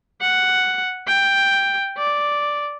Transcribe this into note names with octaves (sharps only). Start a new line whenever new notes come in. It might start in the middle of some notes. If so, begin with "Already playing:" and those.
F#5
G5
D5